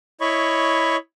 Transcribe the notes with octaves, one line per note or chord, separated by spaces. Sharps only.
E4 C#5 D#5 B5 C#6